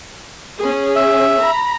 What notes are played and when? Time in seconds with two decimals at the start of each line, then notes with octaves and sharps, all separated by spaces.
0.60 C#4 G#4
0.96 E5
1.42 A#5 B5